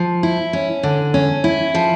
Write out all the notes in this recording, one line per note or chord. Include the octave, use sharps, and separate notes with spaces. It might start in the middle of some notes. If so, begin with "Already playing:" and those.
Already playing: F3
E4
C#4
D3
C#4
E4
F3